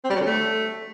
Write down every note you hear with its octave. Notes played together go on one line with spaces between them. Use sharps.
C4
G3
F#3
D3
A3